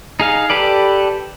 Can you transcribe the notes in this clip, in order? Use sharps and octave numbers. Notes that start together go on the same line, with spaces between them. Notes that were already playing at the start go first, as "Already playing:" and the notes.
D#4 G#4 F5
G4 A4 B4 D5